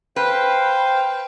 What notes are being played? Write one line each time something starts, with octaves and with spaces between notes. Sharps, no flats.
B4 C5 F5 G5